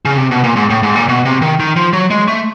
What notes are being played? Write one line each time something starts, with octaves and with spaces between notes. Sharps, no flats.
C#3
C3
B2
A#2
G#2
A2
G#2
A#2
B2
C3
D#3
D#3
F3
F#3
G#3
A3